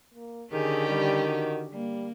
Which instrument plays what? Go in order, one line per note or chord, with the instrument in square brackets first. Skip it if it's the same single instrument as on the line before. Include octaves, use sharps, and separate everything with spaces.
[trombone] A#3
[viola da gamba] D3 C#4 G4 [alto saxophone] D#3 [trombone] G#4
[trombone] G3
F#4
[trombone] G3 [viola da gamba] A#3